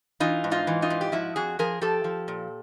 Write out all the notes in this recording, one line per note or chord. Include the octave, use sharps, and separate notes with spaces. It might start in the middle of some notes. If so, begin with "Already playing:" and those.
E3 D#4 F4
G#2
D#4 F4
E3
D#4 F4
G#2
G4
F3 E4 F#4
F2 F#4 G#4
F3 G#4 A#4
F3 G4 A4
F3
A#2